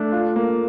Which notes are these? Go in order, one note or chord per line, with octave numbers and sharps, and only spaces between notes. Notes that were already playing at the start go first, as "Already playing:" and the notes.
Already playing: A3 D4
F4
A#3